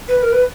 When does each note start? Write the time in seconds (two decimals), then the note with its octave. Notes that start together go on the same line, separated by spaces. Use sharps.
0.08 B4
0.22 A#4
0.32 B4